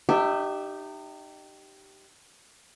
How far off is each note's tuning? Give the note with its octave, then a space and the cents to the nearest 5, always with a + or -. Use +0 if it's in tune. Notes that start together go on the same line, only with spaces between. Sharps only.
D#4 -35 G4 -10 E5 +0